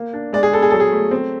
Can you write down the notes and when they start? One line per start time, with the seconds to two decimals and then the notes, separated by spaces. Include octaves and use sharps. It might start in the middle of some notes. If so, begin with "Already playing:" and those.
Already playing: A#3
0.13 D4
0.33 G#3 D5
0.43 G#4
0.52 B3 A4
0.62 G#4
0.70 F#3 A4
0.80 G#4
0.92 A3
1.11 C4